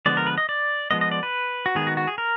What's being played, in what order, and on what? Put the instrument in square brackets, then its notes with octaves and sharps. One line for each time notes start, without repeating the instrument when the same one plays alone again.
[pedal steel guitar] D3 F3 G#3 B3 D5
A#4
B4
D#5
D5
F3 G#3 B3 D#5
D#5
D5
B4
F#4
D#3 G#3 B3 G#4
F#4
F#4
G#4
A#4